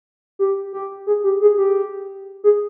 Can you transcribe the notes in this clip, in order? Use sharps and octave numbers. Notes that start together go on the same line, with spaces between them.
G4
G4
G#4
G4
G#4
G4
G#4